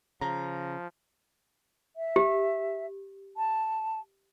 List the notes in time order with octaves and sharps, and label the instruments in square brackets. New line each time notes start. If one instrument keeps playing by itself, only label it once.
[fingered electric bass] C#3 [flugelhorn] F3 [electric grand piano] A#5
[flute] E5
[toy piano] G4
[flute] A5